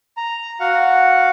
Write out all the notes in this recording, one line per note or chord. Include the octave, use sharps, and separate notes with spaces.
A#5
F#4 F5 F#5